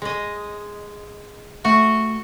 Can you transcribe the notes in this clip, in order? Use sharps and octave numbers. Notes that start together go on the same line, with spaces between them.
G#3 D#5
A3 F#4